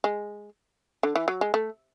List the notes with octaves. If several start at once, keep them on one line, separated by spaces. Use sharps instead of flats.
G#3
D3
E3
F#3
G#3
A3